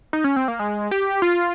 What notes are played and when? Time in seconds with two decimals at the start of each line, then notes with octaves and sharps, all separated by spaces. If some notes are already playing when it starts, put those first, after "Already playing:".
0.13 D#4
0.24 C#4
0.36 C4
0.48 A#3
0.59 G#3
0.91 G4
1.22 F4